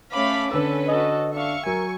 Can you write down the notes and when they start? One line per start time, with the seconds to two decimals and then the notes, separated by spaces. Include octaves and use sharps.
0.13 A3 C#4 F5 B5 D6
0.51 D3 C#4 A4 B4 E6
0.88 F#4 A4 D#5
1.34 D4 E5 F5 C#6
1.66 F#3 A#4 G#5